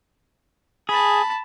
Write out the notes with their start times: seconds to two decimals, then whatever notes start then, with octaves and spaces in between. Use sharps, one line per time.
0.89 G#4 A5 B5